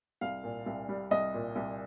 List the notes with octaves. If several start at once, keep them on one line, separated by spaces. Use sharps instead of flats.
C2 F5
A#2
C2
G3
C2 D#5
A#2
C2